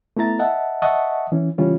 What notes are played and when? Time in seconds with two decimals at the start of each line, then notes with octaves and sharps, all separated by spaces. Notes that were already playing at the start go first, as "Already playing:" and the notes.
0.17 A3 B3 E4 A#5 A6
0.39 D#5 E5 F#5 A5
0.82 D#5 E5 F#5 A5 C#6 D#6
1.32 E3 C#4
1.58 C#3 E3 G3 C#4 F4